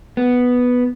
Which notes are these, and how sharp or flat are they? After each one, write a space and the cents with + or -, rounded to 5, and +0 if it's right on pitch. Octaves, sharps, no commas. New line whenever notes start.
B3 +0